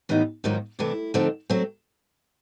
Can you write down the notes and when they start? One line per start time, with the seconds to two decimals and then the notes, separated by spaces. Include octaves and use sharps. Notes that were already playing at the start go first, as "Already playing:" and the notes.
0.09 A2 E3 G3 B3 D#4
0.44 G#2 D#3 F#3 A#3 D#4 F4
0.79 C3 E3 A3 D4 E4
1.14 D3 F3 A3 C4 D#4
1.50 F#3 A3 C4